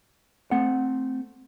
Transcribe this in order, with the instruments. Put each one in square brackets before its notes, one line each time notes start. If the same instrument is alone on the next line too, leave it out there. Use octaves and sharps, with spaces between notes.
[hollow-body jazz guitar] A3 C4 F#5